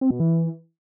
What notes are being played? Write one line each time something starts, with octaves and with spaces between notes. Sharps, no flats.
C4
B2
E3